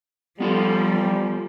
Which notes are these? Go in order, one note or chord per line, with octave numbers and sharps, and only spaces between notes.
F3 G3 B3 F4 A4